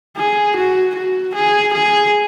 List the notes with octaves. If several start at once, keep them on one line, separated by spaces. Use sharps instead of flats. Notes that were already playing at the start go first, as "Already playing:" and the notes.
G#4
F#4
F#4
G#4
G#4